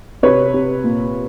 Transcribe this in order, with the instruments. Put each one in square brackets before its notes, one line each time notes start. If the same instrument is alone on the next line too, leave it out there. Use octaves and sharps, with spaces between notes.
[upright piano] C3 B4 C#5
C3
A#2